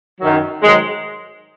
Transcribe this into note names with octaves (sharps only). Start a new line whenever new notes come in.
F#2 D#3 F#3
G#2 D#3 F#3 G#3